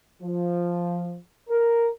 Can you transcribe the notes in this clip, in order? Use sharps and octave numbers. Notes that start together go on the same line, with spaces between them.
F3
A#4